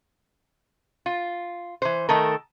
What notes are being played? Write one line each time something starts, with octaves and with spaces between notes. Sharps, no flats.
F4
E3 C5
D#3 A3 A4 A#4